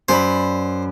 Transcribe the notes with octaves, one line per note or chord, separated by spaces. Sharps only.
F#2 C5 D5 B5